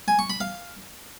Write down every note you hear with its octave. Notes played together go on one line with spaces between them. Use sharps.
G#5
C#6
B5
F5